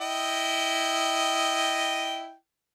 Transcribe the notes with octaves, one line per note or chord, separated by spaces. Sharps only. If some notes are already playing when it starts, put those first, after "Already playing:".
E4 D#5 G5